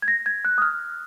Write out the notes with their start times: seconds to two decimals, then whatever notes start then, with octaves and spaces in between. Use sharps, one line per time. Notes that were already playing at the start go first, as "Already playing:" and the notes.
0.02 G#6
0.08 A#6
0.26 G#6
0.45 F#6
0.58 D#6
0.62 F6